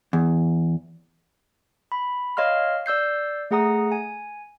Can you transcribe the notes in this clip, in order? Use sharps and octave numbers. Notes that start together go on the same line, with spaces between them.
E2
B5
C#5 D#5 F5 C6 F6
D5 E6 G6 C7
A3 G#4 F#5 A#5 D#6
G#5